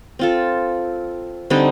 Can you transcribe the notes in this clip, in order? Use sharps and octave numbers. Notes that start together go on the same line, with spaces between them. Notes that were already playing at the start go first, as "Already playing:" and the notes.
C4 F4 A4
D3 G3 C4 D#4